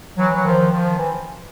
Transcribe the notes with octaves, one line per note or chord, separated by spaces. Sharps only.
E3 F#3
F#3
D#3 F3
D#3 F3
E3